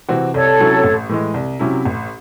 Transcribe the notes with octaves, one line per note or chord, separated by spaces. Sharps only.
C3 E3 C4 F#4
C2 A4 C#5
C3 F#3 C#4 E4
A1
A2 E3 G#3
C2
C3 F#3 C#4 E4
A1